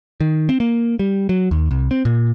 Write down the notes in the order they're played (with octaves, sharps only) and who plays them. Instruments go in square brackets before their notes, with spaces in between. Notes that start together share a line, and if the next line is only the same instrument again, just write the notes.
[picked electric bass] D#3
C4
A#3
G3
F#3
D#2
C2
C4
A#2